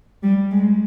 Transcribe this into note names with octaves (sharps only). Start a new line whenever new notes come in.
G3
G#3